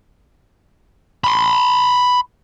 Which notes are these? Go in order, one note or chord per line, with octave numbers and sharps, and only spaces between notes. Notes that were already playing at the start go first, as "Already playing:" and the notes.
B5 C6